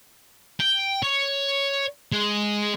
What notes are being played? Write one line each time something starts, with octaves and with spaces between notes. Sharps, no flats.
G5
C#5
G#3